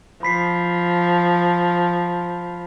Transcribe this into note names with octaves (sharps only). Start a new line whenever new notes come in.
F3 B5 B6 C7